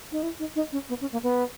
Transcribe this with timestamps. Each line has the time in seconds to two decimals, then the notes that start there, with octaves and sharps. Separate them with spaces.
0.12 D#4
0.23 E4
0.39 D#4
0.56 D#4
0.72 C#4
0.89 B3
1.01 C#4
1.12 A#3
1.23 B3